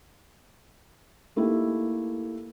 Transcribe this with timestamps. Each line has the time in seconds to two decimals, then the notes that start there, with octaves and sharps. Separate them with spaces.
1.36 A3 A#3 D#4 E4 G4